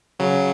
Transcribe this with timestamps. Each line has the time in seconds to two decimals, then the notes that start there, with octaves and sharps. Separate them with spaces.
0.19 C#3 F#3